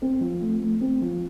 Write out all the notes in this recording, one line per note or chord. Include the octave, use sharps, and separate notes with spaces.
C4
F3
A3
A3
C4
F3